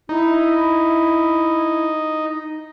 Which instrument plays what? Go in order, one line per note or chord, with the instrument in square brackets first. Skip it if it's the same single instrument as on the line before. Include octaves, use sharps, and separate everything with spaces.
[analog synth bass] D#4 [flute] E4